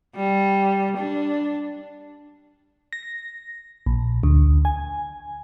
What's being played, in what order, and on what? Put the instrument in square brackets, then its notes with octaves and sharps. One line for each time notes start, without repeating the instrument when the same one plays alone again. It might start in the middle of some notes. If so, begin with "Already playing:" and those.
[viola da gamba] G3
D4
[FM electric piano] A#6
A#1
D2
G#5